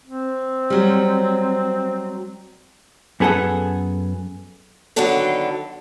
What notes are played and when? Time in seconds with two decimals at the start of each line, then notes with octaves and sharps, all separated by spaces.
0.06 C4
0.70 F#3 G3
3.20 F#2 B3 G#4 A4 F#5
4.96 D3 D#3 F#3 B3 D4 A4